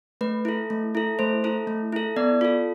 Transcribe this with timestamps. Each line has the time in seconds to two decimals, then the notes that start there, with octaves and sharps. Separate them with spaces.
0.21 A3 B4
0.45 E4 A4
0.70 A3
0.95 E4 A4
1.19 A3 C5
1.44 E4 A4
1.67 A3
1.92 E4 A4
2.17 B3 D5
2.41 F4 A4